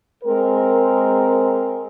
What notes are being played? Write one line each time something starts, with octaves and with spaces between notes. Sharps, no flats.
G#3 C4 A#4